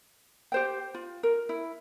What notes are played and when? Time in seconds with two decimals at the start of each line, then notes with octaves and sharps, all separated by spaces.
0.52 G4 C5 G5
0.94 F4
1.23 A#4
1.49 E4